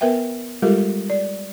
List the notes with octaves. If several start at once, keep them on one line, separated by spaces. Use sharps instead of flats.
B3 A#4 B4 E5 G5
G3 G#3 F4 G4 A4 A#4
D5